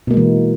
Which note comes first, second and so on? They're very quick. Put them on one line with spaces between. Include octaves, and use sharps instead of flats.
B2 A#3 G#3 E3